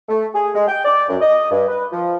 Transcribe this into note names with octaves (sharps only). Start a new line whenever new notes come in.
A3
G#4
G#3
G5
D5
F#2
D#5
G2
B4
F3